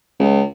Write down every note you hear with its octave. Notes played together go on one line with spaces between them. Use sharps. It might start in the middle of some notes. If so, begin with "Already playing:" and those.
C#2